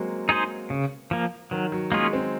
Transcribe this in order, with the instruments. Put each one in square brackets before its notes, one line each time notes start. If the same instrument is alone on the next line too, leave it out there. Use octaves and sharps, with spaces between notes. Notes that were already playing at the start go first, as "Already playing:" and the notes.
Already playing: [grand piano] F#3 G#3 A#3 C4
[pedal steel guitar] D#4 G#4 C5
C#3
F3 A#3
[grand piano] D#3 [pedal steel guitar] F#3
[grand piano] F#3
[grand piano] G#3 [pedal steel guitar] A#3 C#4 F4 G#4
[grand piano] C4